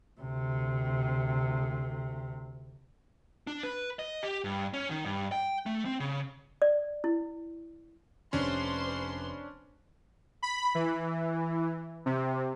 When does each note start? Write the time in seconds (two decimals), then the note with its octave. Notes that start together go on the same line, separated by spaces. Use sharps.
0.21 D2 C3
3.47 D4
3.63 B4
3.99 D#5
4.23 G4
4.44 G2
4.74 C#4
4.90 D#3
5.05 G2
5.32 G5
5.66 A3
5.85 C4
6.00 C#3
6.62 D5
7.04 E4
8.33 F1 C#4 D4 B4 C5 C6
10.43 B5
10.75 E3
12.06 C3